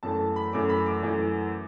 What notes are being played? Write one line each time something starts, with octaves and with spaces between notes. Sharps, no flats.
F#2 E3 A3 A5
A5
B5
F#2 E3 A3 D6
B5
D6
F#2 E3 A3